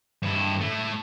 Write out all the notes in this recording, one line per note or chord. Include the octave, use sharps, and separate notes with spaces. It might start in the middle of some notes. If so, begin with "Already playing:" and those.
G2 E4
A3 E4